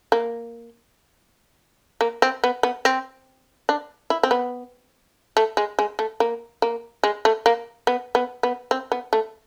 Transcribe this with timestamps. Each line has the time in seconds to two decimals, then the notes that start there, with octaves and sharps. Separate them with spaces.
0.12 A#3
2.01 A#3
2.22 C4
2.44 B3
2.63 B3
2.85 C4
3.69 D4
4.10 E4
4.23 C4
4.31 B3
5.37 A3
5.57 G#3
5.79 G#3
5.99 A3
6.20 A#3
6.62 A#3
7.03 G#3
7.25 A3
7.46 A#3
7.87 B3
8.15 B3
8.43 B3
8.71 C4
8.92 B3
9.13 A3